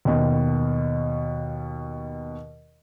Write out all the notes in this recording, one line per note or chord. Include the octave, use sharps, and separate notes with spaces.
D#2 B2